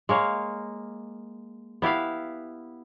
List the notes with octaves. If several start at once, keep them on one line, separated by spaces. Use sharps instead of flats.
G#3 A#3 C#5 F5
B3 E4 G4 F5